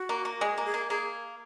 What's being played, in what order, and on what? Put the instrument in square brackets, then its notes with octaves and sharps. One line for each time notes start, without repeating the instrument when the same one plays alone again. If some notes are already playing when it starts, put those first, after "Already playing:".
Already playing: [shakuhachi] F#4
[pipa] A#3
A#3
[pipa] G#3 [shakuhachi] G#4
[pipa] A#3
[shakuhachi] G#4
[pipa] A#3
[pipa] A#3 [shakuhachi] G#4